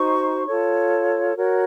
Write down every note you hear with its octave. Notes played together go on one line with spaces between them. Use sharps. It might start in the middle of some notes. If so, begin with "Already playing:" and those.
Already playing: D#4 F#4 C5 C#6
F4 A4 C#5
F#4 A#4 C#5